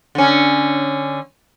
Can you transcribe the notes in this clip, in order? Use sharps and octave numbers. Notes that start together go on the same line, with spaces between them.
D3 C#4